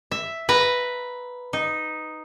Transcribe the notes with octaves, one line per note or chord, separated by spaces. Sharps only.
E5
B4 A#5
D#4